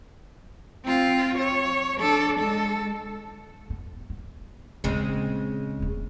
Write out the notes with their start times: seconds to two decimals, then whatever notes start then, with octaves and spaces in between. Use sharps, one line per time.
0.85 C4 F4
1.38 C#5
1.98 D4 A4
2.39 G#3 A4
3.70 B3
4.10 B3
4.84 A#1 D#2 C#3 G#3 C4
5.80 D#1 A3